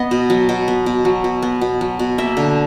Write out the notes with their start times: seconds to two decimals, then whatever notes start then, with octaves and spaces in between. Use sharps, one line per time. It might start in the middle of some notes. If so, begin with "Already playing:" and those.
Already playing: B3 D#5
0.11 B2
0.30 F#3
0.49 B2
0.68 B3
0.86 B2
1.05 F#3
1.24 B2
1.42 B3
1.61 B2
1.81 F#3
1.99 B2
2.18 A#3 E5
2.37 D3